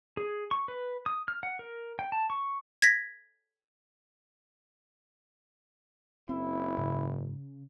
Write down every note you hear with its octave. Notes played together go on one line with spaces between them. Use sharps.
G#4
C#6
B4
D#6
F6
F#5
A#4
G5
A5
C#6
G#6 A#6 B6
F#1 C4 E4
G#2 C#3